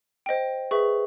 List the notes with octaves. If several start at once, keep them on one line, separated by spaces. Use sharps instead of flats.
C5 D#5 G5
G#4 B4 E5 C#6